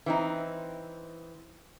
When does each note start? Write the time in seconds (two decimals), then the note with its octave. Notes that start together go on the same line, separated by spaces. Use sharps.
0.06 E3 C4 D#4